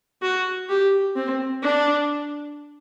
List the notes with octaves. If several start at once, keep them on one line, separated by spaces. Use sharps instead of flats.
F#4
G4
C4
D4